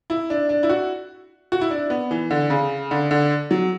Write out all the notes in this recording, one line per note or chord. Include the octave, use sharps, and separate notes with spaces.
E4
D4
D4
E4
F#4
F#4
E4
D4
B3
E3
D3
C#3
D3
D3
F#3